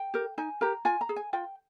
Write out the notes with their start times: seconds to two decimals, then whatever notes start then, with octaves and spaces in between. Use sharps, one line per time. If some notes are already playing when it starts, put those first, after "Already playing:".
Already playing: G5
0.14 G4 A#4
0.38 D#4 G#5
0.61 G4 A#4 A#5
0.85 F4 G#5
1.01 A#5
1.09 G#4
1.16 G#5
1.33 F4 G5